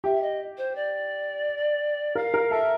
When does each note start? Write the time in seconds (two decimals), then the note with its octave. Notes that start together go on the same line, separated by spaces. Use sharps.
0.04 G4 E5
0.21 D#5
0.57 C5
0.75 D5
2.15 A#4 F5
2.34 A#4
2.51 A4 E5